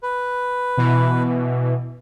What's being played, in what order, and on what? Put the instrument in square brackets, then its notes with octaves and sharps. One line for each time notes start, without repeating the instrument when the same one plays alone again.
[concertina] B4
[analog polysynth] B2 E3